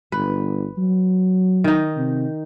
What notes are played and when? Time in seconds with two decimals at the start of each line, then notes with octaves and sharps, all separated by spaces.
0.12 G1 B4
0.78 F#3
1.64 D#3 D#4
1.97 C3